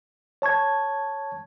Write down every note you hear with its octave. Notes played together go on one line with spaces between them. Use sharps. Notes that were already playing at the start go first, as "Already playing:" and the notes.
C#5 A5 C#6 G#6